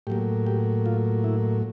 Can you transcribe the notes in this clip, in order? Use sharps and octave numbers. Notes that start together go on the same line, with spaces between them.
A2 F#3 A#3 G4
G4
F4
E4